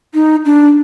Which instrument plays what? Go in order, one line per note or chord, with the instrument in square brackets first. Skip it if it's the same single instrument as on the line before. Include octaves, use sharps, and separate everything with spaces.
[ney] D#4
D4